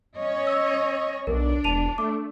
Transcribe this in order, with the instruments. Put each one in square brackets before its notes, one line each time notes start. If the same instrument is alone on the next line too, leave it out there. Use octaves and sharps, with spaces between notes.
[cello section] C#4 C#5 D#5
[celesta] E6
[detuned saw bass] B1 [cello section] D4 [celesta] A#4
[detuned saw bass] E1 [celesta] A5 D#7 F7
[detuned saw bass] A3 [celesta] D6